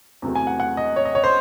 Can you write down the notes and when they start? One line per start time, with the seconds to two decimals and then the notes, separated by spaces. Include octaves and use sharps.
0.22 E2 C3 F#3 A3
0.35 G#5
0.47 F#5
0.60 F#5
0.77 D#5
0.96 C#5
1.05 D#5
1.15 C#5
1.24 C5